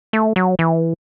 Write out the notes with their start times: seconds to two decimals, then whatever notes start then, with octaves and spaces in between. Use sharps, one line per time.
0.13 A3
0.36 F#3
0.59 E3